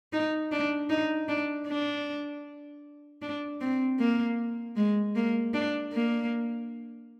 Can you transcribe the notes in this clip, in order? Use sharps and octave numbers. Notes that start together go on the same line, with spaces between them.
D#4
D4
D#4
D4
D4
D4
C4
A#3
G#3
A#3
D4
A#3